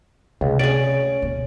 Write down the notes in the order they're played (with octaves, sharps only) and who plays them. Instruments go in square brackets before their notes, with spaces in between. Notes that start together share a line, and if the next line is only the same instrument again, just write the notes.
[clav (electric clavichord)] C#2 [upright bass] C3
[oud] C#4 G#4 [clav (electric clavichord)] D5
[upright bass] E1 D2